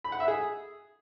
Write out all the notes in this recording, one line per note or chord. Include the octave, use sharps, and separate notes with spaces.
B5
F#5
E5
G#4